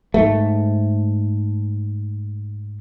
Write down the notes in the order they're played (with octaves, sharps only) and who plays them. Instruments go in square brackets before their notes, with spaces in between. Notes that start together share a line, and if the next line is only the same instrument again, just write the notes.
[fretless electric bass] G#2 A3